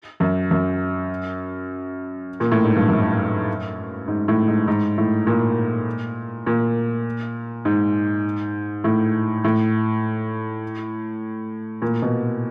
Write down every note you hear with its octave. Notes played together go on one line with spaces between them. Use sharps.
F#2
F#2
A#2
A2
G#2
G2
F#2
G#2
A2
G#2
G#2
A2
A#2
A#2
G#2
A2
A2
A#2
B2